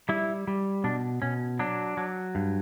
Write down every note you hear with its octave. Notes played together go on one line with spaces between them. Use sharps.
G3 E4
G3
B2 D4
B2 C#4
F#3 D4
F#3
G2